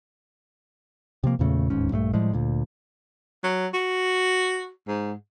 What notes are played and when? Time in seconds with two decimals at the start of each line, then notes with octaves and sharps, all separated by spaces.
1.24 C3 F3 A#3
1.39 E2 A#2 C#3 A3
1.70 D1 D#2 G#2 C#4
1.91 A#1 G2 G#3 A3
2.14 A2 F3 G3 G#3
2.33 D2 A#2
3.44 F#3
3.74 F#4
4.87 G#2